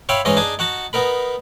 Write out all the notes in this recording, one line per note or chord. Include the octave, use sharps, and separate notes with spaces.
C#5 E5 F5 G5 B5 C6
G#2 E3 C#4 D#4 D#5 C6
D4 D#4 G#4 G#5 A5
D#4 F#4 F#5 A5
B3 D#4 A#4 B5